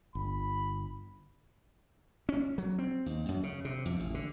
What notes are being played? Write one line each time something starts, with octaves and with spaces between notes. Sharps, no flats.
G1 B5
C#4
F#3
C4
D#2
F#2
C#3
C3
F2
A1
D3